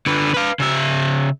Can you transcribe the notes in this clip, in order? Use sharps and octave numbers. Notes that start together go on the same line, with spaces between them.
D3 B4
B4 F5
C#3 E5